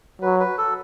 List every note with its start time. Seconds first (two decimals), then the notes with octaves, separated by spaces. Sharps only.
0.22 F#3 B4
0.40 B4
0.58 A4